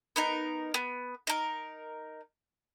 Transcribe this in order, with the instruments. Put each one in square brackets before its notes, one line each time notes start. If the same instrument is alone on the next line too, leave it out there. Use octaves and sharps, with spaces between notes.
[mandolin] B3 D#4 A#4
B3
D#4 A#4